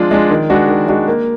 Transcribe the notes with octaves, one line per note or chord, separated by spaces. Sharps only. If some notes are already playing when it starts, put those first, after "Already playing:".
Already playing: F3 G#3 D4 F4
G#3 D4 F4
D#3
G#3 D4 F#4
D#3
G#3 D4 F#4
A#3